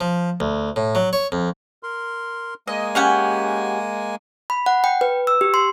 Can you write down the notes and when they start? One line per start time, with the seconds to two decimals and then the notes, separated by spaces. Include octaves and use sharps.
0.01 F3
0.40 D2
0.76 A2
0.95 F#3
1.13 C#5
1.32 F2
1.83 A#4 C6
2.68 G#3 A#3 D#5 G#5
2.95 C#4 G4 F#5
4.50 B5
4.66 F#5
4.84 G5
5.01 B4
5.27 E6
5.41 G4
5.54 C6